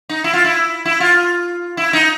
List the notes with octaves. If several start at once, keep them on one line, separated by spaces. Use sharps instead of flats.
D#4
E4
F4
E4
E4
F4
E4
D#4